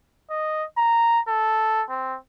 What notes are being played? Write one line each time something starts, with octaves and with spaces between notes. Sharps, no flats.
D#5
A#5
A4
C4